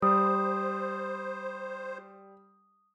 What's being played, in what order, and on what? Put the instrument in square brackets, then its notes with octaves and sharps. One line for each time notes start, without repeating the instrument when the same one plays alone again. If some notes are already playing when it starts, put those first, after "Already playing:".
[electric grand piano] G3 [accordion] C5 [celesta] D#6